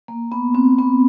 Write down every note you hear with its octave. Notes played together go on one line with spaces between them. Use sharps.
A#3
B3
C4
B3